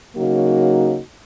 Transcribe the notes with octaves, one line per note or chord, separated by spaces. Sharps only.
C#3 F#3 A#3 D#4 F#4